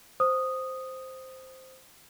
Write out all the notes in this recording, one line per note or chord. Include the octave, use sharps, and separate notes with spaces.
C5 D#6